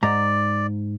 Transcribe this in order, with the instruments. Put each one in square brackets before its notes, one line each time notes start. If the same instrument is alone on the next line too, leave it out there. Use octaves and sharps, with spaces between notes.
[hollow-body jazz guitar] G#2 A#5 [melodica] D5